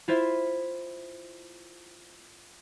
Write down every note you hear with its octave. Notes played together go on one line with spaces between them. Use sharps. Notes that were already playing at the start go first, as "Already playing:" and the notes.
E4 F4 C5 E5